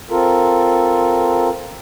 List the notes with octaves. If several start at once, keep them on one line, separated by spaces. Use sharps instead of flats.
C4 F4 A4 A#4